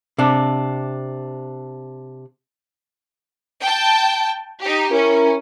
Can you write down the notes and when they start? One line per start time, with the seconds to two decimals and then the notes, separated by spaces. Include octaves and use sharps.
0.18 C3 D4
3.61 G5 A5
4.61 D#4 G4
4.91 C#4 E4 A#4